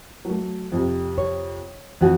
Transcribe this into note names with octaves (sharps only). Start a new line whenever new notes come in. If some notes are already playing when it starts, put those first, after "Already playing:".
F#3 A3
F2 C3
C#5
F2 E3 F#4